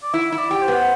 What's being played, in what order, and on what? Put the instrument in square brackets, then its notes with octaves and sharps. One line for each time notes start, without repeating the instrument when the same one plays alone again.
[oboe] D5
[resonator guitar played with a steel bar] E4 [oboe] E5
[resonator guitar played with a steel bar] E4
[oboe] D5
[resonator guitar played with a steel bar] G4
[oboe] C5
[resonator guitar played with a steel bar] B3